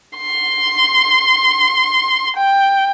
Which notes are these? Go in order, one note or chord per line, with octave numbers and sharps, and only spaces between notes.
C6
G5